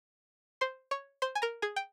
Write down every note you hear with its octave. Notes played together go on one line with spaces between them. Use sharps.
C5 C6
C#5 C#6
C5 C6
G#5
A#4 A#5
G#4 G#5
G5